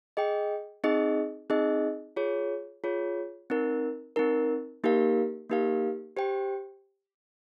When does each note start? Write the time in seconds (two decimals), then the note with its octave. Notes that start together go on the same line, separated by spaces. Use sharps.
0.17 G#4 D#5 G5
0.84 C4 D#4 G#4 D#5
1.50 C4 D#4 G#4 D#5
2.16 F4 G#4 C#5
2.84 F4 G#4 C#5
3.50 C4 D#4 A#4
4.16 C4 D#4 A#4
4.84 A#3 D#4 G4 A#4 F5
5.49 A#3 D#4 G4 A#4 F5
6.17 G4 C5 G5